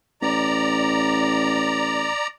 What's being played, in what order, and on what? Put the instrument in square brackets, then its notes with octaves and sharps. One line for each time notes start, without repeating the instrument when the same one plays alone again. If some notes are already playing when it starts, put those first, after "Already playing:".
[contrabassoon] A1 [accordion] D5 A#5